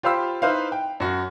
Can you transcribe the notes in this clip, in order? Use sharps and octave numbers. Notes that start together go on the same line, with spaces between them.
F4 G4 C5 F5 B5 E6
D#4 E4 B4 C5 E5 F5
G5
F#2 F#4